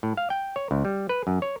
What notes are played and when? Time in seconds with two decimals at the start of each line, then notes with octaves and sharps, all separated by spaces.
0.03 A2
0.17 F5
0.30 G5
0.56 C#5
0.71 C#2
0.85 G3
1.09 B4
1.27 F#2
1.42 C#5